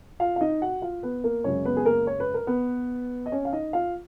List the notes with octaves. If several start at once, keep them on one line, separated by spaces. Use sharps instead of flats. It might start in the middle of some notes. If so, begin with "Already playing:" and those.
F4 F5
F5
D#4 D#5
F#4 F#5
F4 F5
B3 B4
A#3 A#4
F#2 C#3 G#3 C#4 C#5
B3 B4
G#4
A#3 A#4
C#5
B4
A#4
B3 B4
D#5
C#4 C#5
F5
D#4 D#5
F4 F5